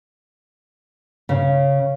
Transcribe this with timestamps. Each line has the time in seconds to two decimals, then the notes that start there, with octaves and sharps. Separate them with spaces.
1.29 C#3